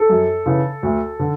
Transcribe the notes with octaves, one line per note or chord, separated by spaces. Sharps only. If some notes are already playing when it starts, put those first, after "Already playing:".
Already playing: A4
F#2
C#3 E3
D2
D3